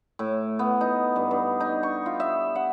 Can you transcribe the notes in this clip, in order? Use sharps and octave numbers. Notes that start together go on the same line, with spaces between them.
A2
B3
D#4
G2
G2
D#4
C#6
F4
E5
F#5